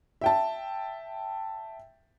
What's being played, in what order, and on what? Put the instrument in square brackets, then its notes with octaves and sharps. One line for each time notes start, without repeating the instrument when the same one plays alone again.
[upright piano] E5 G5 A5